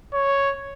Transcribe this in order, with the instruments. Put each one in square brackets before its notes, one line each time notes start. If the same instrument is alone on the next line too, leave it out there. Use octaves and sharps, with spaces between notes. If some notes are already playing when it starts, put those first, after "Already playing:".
[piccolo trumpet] C#5